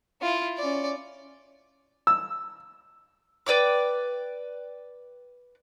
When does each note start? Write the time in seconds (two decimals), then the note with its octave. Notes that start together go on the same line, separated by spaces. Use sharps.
0.22 E4 F4
0.57 C#4 D5
2.07 E6
3.46 B4 D5 G5 D6